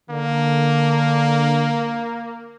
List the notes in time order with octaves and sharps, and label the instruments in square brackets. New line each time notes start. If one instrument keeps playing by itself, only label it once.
[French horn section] D3 [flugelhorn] A#3